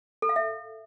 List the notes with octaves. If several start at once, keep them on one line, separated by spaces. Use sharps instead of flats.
A4
F5
E5